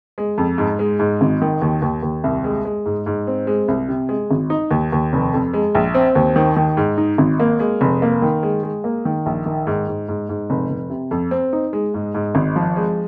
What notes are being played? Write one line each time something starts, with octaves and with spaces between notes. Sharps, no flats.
G#3
F2
G#2
G#3
G#2
G#1
D#3
D#2
D#2
D#2
C2
G#3
G#3
G#2
G#2
C4
G#3
C2
C3
G#3
G#1
D#4
D#2
D#2
F1
F2
G#3
A#1
C4
D#2
D#3
D#3
G#2
D#4
G#1
A#3
G#3
F1
A#3
D#3
G#3
G#3
A#3
D#3
A#1
D#3
G#2
G#2
G#2
G#2
F1
F1
C3
F2
C4
D#4
G#3
G#2
G#2
G#1
F3
G#3